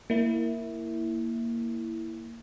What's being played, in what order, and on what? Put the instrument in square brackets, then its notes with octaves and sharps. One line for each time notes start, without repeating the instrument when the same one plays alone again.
[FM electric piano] A#3 E4